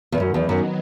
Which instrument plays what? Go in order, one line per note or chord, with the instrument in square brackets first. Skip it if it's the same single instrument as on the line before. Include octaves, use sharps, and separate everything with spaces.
[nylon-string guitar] E2
[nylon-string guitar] F#2 [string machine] D#3 F#3 B3 D#4
[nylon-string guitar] E2
F#2